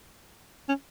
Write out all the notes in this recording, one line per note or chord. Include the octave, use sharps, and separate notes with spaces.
C#4